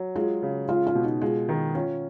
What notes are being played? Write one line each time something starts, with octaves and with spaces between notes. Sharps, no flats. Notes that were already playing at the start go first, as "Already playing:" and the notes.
Already playing: F#3
G#3 F4 G#4
C#3
G#3 F4
F4
B2
D#4
G#3 F4
D#3
C#4 F4